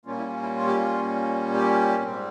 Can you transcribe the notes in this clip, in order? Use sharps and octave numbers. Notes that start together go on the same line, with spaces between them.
A#2 G3 A#3 C#4 F4
E4
F4
E4
F4
G4
F4
G4
G#2 G3 C4